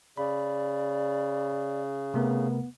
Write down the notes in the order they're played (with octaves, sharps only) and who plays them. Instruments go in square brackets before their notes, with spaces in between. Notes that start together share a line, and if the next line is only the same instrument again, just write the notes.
[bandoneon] C#3 [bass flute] D5 [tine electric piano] B5
[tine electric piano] C3 A3 A#4 [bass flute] B3